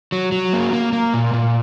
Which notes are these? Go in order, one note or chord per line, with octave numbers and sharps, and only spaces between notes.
F#3
F#3
A#3
A#3
A#3
A#2
A#2